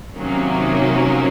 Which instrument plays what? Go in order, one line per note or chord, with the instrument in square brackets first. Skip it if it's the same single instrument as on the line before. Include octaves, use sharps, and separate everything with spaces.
[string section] C3 D#3 F#3 A#3 C#4